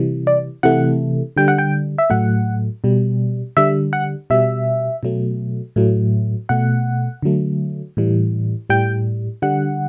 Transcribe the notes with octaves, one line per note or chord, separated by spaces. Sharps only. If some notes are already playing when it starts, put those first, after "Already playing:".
Already playing: C3 E3 G3
D5
C3 E3 A3 F#5
D3 G3 G5
F#5
G5
E5
A2 F#3 A3 F#5
B2 G3
D3 G3 E5
F#5
B2 G3 E5
B2 F#3 A3
A2 F#3 A3
B2 A3 F#5
D3 F#3 A3
A2 E3 G3
A2 G3 G5
D3 G3 F#5